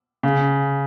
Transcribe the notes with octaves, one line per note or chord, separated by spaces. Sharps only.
C#3